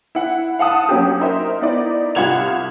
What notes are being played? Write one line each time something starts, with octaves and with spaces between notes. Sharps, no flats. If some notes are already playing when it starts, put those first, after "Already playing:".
E4 F#5
F5 F#5 A5 D#6
F#3 A#3 C#4 F#4 G4
D#4 A#4 C5 E5
B3 D#4 E4 D5
C2 F4 F#5 G#6 E7 F7